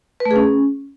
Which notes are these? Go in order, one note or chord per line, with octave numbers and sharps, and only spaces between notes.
B4
A3
G#4
C#4